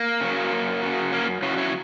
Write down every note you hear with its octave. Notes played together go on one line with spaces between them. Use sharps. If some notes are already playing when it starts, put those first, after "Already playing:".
Already playing: A#3
C#3 F#3
F#2
C#3 F#3
F#2 A#3 C#4
C#3 F#3 C#4 E4
C#4 E4